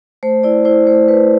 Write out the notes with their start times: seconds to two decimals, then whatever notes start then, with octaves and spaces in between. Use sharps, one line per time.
0.23 A3 C5
0.43 E4 D5
0.65 E4 C5
0.87 A3 C5
1.08 A3 B4